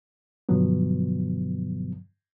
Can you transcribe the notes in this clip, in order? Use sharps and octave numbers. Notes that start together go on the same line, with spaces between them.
G2 B2 D3 F3 F#3 B3